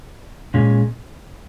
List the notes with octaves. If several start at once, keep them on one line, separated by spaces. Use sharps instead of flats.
A#2 G#3 C#4